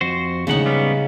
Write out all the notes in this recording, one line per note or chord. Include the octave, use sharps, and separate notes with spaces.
F2 F#4 C5
D#2 A2 C#3 G#3 D#4 F#5
G3 B3 C#4